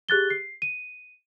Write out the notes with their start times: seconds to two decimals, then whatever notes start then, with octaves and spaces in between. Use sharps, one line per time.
0.09 G4 G#4 F#6 A6 G7
0.30 C7
0.62 D#7